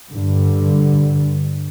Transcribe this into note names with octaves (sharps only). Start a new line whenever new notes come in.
G2 D3